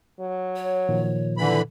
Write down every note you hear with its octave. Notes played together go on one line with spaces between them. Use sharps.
F#3
C#5
A#2 D#3 F3
D3 E3 B5